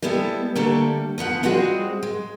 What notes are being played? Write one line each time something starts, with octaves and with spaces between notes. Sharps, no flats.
G3 G#3 B3 E4 A4
D3 G3 A3 A#3 A4
D2 F3 B3 F#5
G3 G#3 C4 F4 F#4 G#4
G#3